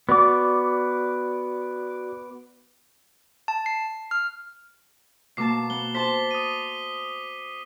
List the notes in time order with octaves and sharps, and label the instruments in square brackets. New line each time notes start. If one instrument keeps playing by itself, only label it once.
[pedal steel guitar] B3 D6 [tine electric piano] F#4 D5
[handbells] A5
C7
F6
[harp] B2 A#3 A5 [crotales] D6 C7
[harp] B3 [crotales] G7
[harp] C5 A5 [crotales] B6 G7
[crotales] D#6 D#7